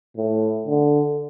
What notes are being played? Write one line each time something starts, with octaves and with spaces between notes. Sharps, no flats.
A2
D3